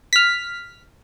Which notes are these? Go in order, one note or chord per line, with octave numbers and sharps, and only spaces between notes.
F6 B6